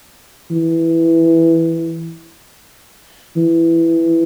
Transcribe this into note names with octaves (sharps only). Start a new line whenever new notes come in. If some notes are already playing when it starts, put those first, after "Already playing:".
E3
E3